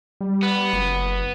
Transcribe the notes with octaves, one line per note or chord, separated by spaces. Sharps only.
G3
B3
F#1